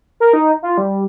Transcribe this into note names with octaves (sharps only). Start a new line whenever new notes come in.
A#4
D#4
F4
G3